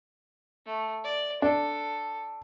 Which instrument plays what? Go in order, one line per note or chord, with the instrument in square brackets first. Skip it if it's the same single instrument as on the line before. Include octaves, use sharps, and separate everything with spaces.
[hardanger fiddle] A3
D5
[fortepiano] D4 [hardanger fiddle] A4